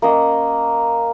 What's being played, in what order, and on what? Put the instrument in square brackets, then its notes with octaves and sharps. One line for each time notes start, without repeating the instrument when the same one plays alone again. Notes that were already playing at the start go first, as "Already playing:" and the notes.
[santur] A#3 C#4 D#5